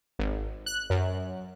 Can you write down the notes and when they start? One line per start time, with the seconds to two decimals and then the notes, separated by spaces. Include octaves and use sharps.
0.19 G#1
0.66 F#6
0.90 F#2